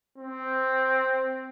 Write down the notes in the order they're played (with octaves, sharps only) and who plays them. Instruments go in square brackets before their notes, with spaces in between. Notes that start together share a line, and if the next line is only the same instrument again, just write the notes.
[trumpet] C4